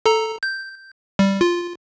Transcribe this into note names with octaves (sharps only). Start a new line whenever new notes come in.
A4 A#5
G6
G3
F4